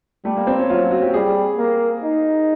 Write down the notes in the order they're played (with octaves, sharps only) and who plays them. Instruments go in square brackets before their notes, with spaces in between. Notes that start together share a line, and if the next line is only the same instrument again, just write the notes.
[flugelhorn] G3 [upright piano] A3
[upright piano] A#3
C4
C#4
[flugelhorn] F#3 [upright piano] F4
[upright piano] F#4
G4
[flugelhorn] G3 [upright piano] G#4
[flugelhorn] A#3
D#4